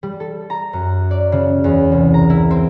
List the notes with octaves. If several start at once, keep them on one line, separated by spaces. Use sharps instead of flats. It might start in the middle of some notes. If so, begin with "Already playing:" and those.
G3
A4
A#5
F#2
D5
C#3
E2
C2
A#5
E4
C4